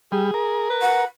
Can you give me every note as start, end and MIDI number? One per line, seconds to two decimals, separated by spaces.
0.12 0.31 55
0.12 0.65 68
0.34 1.05 70
0.70 1.04 71
0.81 1.03 78